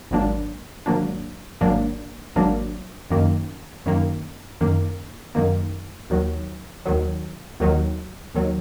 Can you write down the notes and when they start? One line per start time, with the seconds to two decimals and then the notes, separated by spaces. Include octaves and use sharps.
0.11 G#1 G#2 F#3 A#3 D4
0.86 G#1 G#2 F#3 A#3 D4
1.61 G#1 G#2 F#3 A#3 D4
2.36 G#1 G#2 F#3 A#3 D4
3.10 F#2 D#3 A#3
3.86 F#2 D#3 A#3
4.61 F#2 D#3 A#3
5.35 F#2 D#3 A#3
6.10 D#2 D#3 F#3
6.86 D#2 D#3 F#3
7.60 D#2 D#3 F#3
8.35 D#2 D#3 F#3